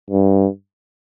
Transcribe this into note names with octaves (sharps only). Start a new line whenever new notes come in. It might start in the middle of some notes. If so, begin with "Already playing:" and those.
G2